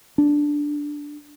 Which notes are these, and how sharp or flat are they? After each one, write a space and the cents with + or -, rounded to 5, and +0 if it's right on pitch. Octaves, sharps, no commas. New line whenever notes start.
D4 +0